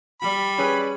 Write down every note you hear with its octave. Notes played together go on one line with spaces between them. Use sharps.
G3 B5
C#4 G#4 B4